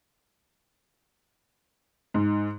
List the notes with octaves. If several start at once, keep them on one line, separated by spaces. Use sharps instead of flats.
G#2